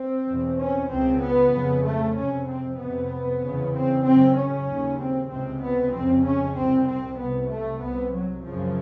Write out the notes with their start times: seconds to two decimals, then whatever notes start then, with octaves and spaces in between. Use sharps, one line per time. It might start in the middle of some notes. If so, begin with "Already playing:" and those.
Already playing: C4
0.28 E2 B2
0.59 C#4
0.90 C#2 C#3 C4
1.22 B3
1.53 F2 C#3
1.85 A3
2.16 F2 C3 C#4
2.47 C4
2.79 F2 C3 B3
3.42 E2 C#3
3.73 C4
4.05 F#2 C#3 C4
4.36 C#4
4.68 D#2 C#3
4.99 C4
5.30 C#2 C3 C4
5.62 B3
5.93 F2 C#3 C4
6.25 C#4
6.56 C2 C3 C4
6.88 C4
7.19 C2 C3 B3
7.50 A3
7.81 C2 C3 B3
8.13 F#3
8.44 F#2 C#3 F3